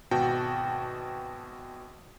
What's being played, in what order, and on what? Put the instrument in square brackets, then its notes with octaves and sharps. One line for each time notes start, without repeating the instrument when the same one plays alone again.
[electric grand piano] G#1 B2 F#4 G5 A5